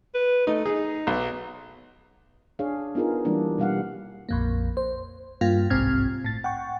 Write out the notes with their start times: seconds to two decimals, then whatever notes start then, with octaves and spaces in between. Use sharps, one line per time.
0.14 B4
0.47 A3 D#4
0.66 D#4 G#4
1.07 B1
2.59 D4 G#4 C#5 F5
2.95 B3 D#4 F4 G#4 A#4
3.25 E3 G3 G#3 A#3 D4 E4
3.58 B2 G3 F5 F#5
4.29 A#1 F2 A#3
4.77 C5
5.41 G2 A#3 F4 F5
5.70 G1 C2 G#2 C4 F6 G#6
6.24 A2 A6
6.44 F#5 G5 C#6